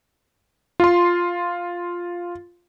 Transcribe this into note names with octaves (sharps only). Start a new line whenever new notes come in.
F4 C6